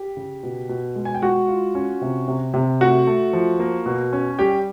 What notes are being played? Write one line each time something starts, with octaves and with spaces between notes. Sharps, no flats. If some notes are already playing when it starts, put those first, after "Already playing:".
Already playing: G4
C#3
B2
B2
G#3
G#5
G5
G#3 F#4 F#5
F4
C#4
C3
C3
C3
A3 F#4 F#5
A3
F3
A#3
B2
C#4
G3 G4 G5